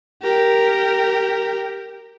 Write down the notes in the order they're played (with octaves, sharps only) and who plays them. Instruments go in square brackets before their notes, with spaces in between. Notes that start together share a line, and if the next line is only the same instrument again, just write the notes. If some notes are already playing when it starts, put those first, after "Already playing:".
[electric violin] G4 A#4